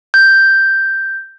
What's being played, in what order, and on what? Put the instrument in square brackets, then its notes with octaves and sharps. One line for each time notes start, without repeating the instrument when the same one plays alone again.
[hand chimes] G6